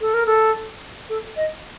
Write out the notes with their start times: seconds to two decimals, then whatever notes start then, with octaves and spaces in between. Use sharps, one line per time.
0.01 A4
0.14 A#4
0.26 A4
1.09 A4
1.36 D#5